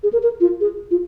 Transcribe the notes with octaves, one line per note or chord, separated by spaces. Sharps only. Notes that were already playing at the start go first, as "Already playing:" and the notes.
G#4
A#4
A#4
F4
G#4
F4